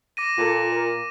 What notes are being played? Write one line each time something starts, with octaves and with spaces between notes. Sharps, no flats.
D6 A#6 D#7
A#2 F4 A4
A#4